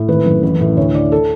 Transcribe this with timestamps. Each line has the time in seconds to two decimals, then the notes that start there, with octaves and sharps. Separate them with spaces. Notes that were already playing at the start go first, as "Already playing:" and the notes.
Already playing: A2
0.08 G#1 B4
0.26 F#2
0.43 A1 B4
0.60 A2
0.77 D2 C#5
0.95 D3 D5
1.12 A4